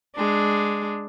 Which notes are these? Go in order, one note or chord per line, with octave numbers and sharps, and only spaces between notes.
G#3 D4